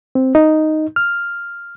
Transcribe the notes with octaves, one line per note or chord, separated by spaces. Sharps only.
C4
D#4
F6